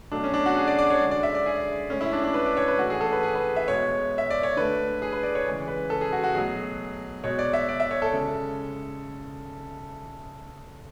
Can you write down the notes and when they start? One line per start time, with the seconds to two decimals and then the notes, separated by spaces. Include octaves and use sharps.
0.12 B2 F#3 A3 D4
0.24 C#4
0.34 D4
0.46 F#4
0.57 G#4
0.67 D5
0.79 D5
0.90 C#5
1.01 D3 G#3
1.11 D5
1.23 E5
1.35 D5
1.46 G#4
1.90 A2 G#3 C#4
2.01 E4
2.13 D4
2.24 D4
2.34 B4
2.46 D5
2.57 C#5
2.68 B4
2.79 A2 E3 A3 F#4
2.90 G#4
3.01 A4
3.12 B4
3.23 G#4
3.35 B4
3.56 E5
3.68 B2 G#3 C#5
4.18 E5
4.30 D5
4.43 C#5
4.57 D3 A3 B4
5.02 G#4
5.13 B4
5.23 D5
5.35 C#5
5.46 C#3 E3 G#3
5.68 B4
5.90 A4
6.01 G#4
6.13 F#4
6.24 F#4
6.34 B2 F#3 A3 G#4
7.24 B2 G#3 C#5
7.39 D5
7.53 E5
7.69 D5
7.80 E5
7.91 C#5
8.02 A4
8.13 C#3 G#3